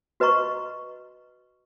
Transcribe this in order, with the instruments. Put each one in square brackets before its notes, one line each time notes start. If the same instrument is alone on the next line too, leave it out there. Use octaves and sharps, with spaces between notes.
[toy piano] F#4 B4 D#5 A#5 C#6